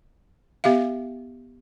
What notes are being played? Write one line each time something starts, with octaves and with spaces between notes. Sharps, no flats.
B3 G4 E5 F5